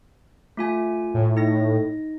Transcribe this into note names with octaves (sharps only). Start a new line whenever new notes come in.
A3 F4 G#5
A2
D#4 A#6